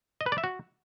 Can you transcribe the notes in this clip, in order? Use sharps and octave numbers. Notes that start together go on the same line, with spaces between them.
D#5
B4
D5
E5
F#4